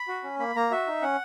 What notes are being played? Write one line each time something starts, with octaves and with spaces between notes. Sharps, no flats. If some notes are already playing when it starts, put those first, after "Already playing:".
Already playing: B5
F#4
C#4
A#3 B5
A#3 A#5
F#4 E5
D#4
C#4 F#5